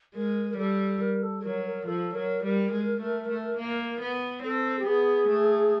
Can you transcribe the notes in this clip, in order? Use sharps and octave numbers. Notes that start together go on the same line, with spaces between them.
G#3 A#4
A#4
G3 A4
A#4
A4
F#3 A#4
A#4
F3 A4
F#3 A#4
G3 A#4
G#3
A3
A3
A#3
B3
C4 A4
G4
B3 G#4
A3